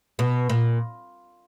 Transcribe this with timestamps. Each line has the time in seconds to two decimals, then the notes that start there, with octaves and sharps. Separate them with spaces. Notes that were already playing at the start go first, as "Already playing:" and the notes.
0.19 B2
0.50 A#2